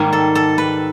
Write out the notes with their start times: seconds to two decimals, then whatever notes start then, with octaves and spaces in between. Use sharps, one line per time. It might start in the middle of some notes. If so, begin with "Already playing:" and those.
Already playing: G#2 D#3 G3 A#3
0.13 A4
0.35 A4
0.58 B4